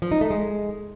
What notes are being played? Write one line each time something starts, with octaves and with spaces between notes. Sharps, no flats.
F3
D#4
A3
G#3